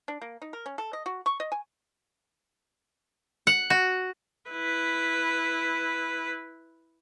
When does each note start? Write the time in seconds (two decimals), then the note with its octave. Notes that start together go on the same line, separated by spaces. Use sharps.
0.08 D4
0.22 A#3
0.42 D#4
0.53 A#4
0.66 C#4
0.78 A4
0.93 D#5
1.06 F#4
1.26 C#6
1.40 D#5
1.52 G#5
3.47 F#5
3.70 F#4
4.50 E4 B4